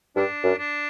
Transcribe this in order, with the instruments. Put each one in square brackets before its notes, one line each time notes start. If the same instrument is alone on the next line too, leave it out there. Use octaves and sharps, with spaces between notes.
[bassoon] G2 [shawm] D4
[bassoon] F#2
[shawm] D4